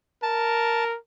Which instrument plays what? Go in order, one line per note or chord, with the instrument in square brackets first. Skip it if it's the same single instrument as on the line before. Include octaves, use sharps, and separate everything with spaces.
[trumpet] A#4 [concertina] A5